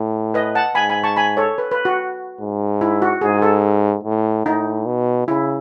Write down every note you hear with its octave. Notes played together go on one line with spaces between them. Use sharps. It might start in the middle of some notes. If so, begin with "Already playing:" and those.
Already playing: A2
B4 D#5
F#5 A5
G#2 G#5 B5
G#5 B5
A5 C#6
G#5 B5
A4 C#5
B4
B4
F#4
G#2
E4
F#4
G#2 G#4
A4
A2
A2 D#4
B2
C#3 E4